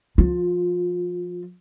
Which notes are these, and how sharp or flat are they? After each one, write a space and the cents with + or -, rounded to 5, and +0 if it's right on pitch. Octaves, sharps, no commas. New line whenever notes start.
F3 +0 F4 +25